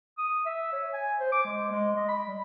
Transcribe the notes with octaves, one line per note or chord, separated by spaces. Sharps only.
D#6
E5
C#5
G#5
C5
D6
G#3
G#3
D#5
B5
G3